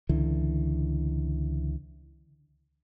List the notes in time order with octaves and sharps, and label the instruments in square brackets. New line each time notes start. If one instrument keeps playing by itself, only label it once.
[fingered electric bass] C#2 D3 E3